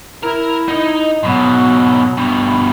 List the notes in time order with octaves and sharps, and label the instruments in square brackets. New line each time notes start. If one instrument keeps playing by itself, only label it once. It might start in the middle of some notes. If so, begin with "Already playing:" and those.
[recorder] E4 [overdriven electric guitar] A#4
[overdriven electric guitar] D#4 D#5
[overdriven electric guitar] G#2 B2 [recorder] F#3
[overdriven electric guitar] G2 B2